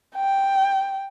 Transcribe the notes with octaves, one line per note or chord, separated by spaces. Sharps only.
G5